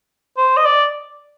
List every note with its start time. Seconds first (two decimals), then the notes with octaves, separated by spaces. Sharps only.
0.37 C5
0.57 D#5
0.65 D5